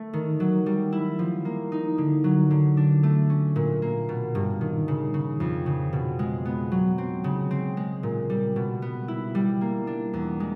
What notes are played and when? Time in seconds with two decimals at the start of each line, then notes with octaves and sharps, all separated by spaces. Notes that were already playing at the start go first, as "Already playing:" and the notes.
Already playing: A3
0.13 D#3
0.40 F#3
0.66 G3
0.92 E4
1.19 F3
1.45 A#3
1.72 D#4
1.98 D3
2.24 F#3
2.51 D3
2.77 D4
3.03 A3
3.30 C#4
3.56 A#2
3.82 A#3
4.09 B2
4.35 G2
4.61 D#3
4.88 C#3
5.14 C#3
5.40 F2
5.66 C#3
5.93 B2
6.19 G#3
6.45 B3
6.72 F#3
6.98 C4
7.24 C#3
7.51 C4
7.77 G#3
8.03 A#2
8.30 G3
8.56 B2
8.82 B3
9.08 E4
9.35 G3
9.61 A#3
9.87 D4
10.13 E2
10.40 G#3